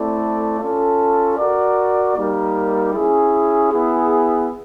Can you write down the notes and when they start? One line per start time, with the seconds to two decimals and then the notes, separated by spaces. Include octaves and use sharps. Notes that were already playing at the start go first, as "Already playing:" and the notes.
Already playing: A3 C4 E4 A4 D5
0.60 C#4 F4 A4
1.37 F#4 A#4 D5
2.16 G3 A#3 D#4 G4 A#4
2.94 C#4 E4 G#4
3.72 B3 E4 G#4